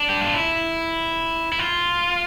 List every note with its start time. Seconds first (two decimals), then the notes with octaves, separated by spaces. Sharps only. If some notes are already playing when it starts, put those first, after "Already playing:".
Already playing: D4
0.09 G4
0.21 F4
0.34 E4
1.52 E4
1.59 F4